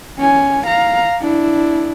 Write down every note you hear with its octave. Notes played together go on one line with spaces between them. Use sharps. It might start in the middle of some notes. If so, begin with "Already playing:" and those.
C#4 G#5
F5 A#5
D4 E4